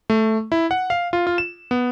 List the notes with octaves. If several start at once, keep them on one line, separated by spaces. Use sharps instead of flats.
A3
E4
F#5
F5
F4
F4
E7
B3